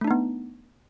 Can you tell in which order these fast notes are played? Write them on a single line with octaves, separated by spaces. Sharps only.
A3 D4 D#4 B3